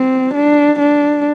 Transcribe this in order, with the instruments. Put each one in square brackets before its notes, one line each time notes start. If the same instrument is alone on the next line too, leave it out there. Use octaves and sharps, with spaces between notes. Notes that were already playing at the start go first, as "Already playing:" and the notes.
Already playing: [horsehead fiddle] C4
D4
D4